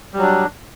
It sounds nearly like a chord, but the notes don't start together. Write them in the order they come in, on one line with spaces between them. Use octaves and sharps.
G3 F#3 D4